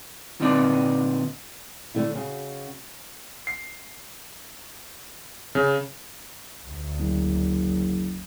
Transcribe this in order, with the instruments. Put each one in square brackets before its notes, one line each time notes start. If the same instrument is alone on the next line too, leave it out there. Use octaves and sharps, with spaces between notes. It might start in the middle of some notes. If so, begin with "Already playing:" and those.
[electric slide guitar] A#2 D3 C4 D#4 B4 D5
[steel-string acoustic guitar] D3 A3 D4 E4
C#3 F#4
[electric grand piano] C7
C#3
[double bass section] D2
[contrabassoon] F#1